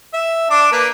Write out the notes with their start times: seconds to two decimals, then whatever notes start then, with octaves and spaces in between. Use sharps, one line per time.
0.13 E5
0.51 D4 D6
0.72 A#3 B4